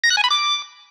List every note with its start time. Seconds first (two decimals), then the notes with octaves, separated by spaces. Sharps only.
0.04 A#6
0.10 F#6
0.17 G#5
0.24 B5
0.31 D6